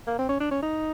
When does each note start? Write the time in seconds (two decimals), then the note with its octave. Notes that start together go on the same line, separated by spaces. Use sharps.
0.07 A#3
0.19 C4
0.29 C#4
0.40 D4
0.51 C#4
0.62 D#4